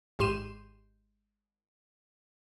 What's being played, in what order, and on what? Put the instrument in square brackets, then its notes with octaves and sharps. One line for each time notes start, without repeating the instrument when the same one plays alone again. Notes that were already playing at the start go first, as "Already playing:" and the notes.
[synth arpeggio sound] G#1 G#2 G4 C6 D#7 E7